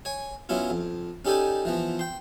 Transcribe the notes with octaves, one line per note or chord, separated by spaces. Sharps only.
C#5 G#5
F#3 B3 C#4 E4 F4
F2
C#4 D#4 G4 A4 D5 G#5
E3 F3 B3
G5 C6